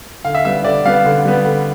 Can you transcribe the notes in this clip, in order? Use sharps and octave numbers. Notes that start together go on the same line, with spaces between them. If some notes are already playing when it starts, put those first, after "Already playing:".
D3 F5
E5
G3 B3 E5
D3 D5
G3 B3 F5
D3
G3 B3
D3